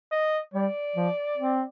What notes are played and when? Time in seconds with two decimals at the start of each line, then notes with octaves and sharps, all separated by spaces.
0.12 D#5
0.54 G3 D5
0.96 F3
1.38 C4